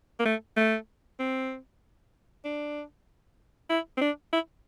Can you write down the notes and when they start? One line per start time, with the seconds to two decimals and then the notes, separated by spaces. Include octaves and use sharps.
0.19 A#3
0.25 A3
0.57 A3
1.19 C4
2.44 D4
3.69 E4
3.97 C4
4.01 D4
4.32 E4